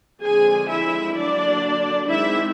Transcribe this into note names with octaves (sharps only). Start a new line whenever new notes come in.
D3 F3 G#3 C4 G#4 G#5
E4 E5
D3 F#3 A#3 D4 D5
D#3 G#3 C4 E4 E5